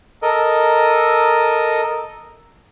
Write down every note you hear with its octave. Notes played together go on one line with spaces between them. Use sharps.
A4 A#4 D#5